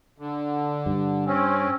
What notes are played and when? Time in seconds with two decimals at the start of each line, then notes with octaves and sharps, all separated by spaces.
0.18 D3
0.86 G2
1.26 C4 C#4